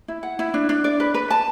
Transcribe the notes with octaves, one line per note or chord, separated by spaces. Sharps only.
E4
F#5
E4
D4
D4
D5
B4
B4
A5